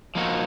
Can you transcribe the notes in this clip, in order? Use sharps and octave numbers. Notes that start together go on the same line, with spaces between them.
F3 A#3 D#4 F#4